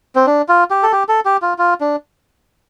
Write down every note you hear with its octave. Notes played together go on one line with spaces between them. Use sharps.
C4
D4
F4
G4
A4
G4
A4
G4
F4
F4
D4